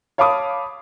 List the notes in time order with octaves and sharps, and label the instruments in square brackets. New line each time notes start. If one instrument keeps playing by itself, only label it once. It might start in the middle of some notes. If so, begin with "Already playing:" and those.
[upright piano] C#5 F5 A5 B5 D6 D#6